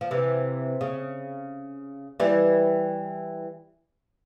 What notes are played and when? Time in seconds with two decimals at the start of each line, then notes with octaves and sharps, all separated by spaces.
0.01 F3
0.11 C3 E3
0.81 C#3
2.20 E3 G3